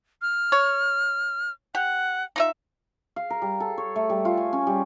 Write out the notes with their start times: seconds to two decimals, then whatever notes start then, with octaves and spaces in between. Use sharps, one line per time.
0.22 F6
0.52 C#5
1.75 G4 F#5
2.36 D#4 F4 E5
3.16 F5
3.30 A#4
3.42 G3
3.60 A4
3.78 C#5
3.96 A3
4.10 G3
4.25 F4
4.37 G#5
4.53 C#4
4.67 G3